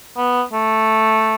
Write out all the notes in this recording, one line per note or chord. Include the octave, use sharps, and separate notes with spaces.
B3
A3